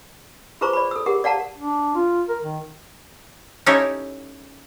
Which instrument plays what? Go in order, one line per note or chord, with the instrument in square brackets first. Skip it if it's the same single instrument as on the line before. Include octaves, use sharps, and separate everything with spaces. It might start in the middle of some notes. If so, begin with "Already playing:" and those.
[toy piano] F4 G#4 B4 C5 A#5 C#6
D5 B5
A4 E6
G4 G#4 A#4 F#5
D5 F5 F#5 A5 A#5
[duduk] D4
F4
A#4
D#3
[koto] C#4 D#4 E4 G4 A4 C#5